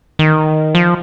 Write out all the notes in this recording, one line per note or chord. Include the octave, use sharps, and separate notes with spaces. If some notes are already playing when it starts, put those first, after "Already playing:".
D#3
F3